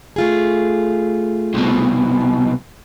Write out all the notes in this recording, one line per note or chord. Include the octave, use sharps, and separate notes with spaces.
A3 F4 G#4
C2 B2